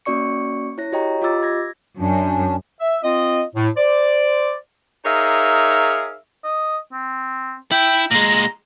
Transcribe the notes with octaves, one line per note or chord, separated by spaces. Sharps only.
A#3 C#4 F#4 D5 C#6 C#7
E4 C#5 A#6
F#4 G4 C#5 D#5 G5 A#5
F4 G4 D#5 D6 E6 A6
G#6 A#6
F#2 C#4 D4
E5
C4 F4 D#5
A2
C5 D5
D#4 G#4 A#4 C#5 E5 F5
D#5
C4
E4 G5
A#2 G#3 A#5